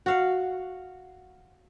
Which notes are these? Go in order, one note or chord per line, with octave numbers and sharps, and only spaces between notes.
F#4 F5 F#5